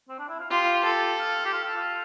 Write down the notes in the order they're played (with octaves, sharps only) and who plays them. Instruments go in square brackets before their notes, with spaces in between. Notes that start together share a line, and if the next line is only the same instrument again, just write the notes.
[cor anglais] C4
D4
E4
F4
[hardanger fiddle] F4 [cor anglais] G4
[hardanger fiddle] A4
[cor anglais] F4
G4
F4
F4
F4